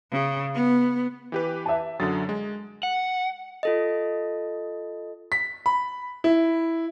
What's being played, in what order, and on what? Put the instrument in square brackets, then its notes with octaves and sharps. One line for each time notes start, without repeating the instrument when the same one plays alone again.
[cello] C#3
B3
[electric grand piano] E3 G4 B4
[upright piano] E5 A5
[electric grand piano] F#2 D3 F#3 [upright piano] D#6 A6
[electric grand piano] G#3
[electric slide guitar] F#5
[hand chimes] F4 A4 D#5
[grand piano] B6
B5
E4